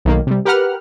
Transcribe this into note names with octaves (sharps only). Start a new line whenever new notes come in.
B1 D#3 A#3
C3 G3
G4 A#4 B4 F#5 F6